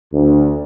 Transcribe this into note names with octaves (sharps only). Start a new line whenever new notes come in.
D2